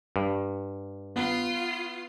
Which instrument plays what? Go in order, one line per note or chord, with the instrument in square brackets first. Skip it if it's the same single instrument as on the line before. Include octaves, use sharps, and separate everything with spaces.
[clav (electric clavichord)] G2
[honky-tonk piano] B3 [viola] F4 C6